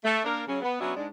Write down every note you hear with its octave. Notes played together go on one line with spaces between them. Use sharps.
A3
A#3 D4 A#4
C#3 F#3 C#4
B3
F#3 B3 C#4 D4 F#4 E5
G#2 G#3 D4